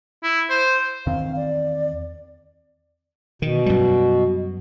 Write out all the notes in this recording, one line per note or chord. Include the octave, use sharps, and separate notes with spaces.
E4
C5
E2 D#3 C4 F5
D5
B2 D#3
F#2 G3